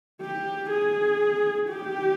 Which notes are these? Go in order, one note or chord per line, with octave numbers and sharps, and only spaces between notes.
G4
G#4
G4